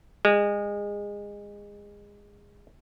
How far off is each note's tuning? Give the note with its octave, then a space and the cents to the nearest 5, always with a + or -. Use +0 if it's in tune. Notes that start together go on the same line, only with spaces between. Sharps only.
G#3 -25